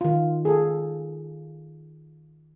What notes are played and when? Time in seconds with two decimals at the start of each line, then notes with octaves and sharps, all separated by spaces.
0.01 D#3 F4
0.45 G#4 A4